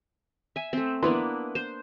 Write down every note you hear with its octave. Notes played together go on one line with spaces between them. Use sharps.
E5 G#5
A3 C4
A#3 B3 D4 E4 B4 C6
C5